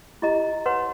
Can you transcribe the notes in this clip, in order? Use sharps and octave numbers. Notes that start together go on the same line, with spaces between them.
E4 G4 D#5 A#5
B4 C#5 F#5 C6